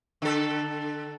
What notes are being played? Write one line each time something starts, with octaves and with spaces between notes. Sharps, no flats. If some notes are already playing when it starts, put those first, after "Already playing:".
D3 A4